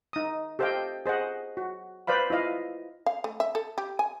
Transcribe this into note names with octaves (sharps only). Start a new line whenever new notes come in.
D#4 D#6
G4 A4 C5 D#5 F5 G5
G#4 C5 D#5 F#5
F#4
B4 C5 D5 F5 B5
E4 F4 D#5 F5
F5
A3
E5
A4
G4
G#5